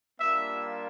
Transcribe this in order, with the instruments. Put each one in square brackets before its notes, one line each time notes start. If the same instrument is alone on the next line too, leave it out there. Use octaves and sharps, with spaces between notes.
[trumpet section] G3 A#3 D4 F4 E5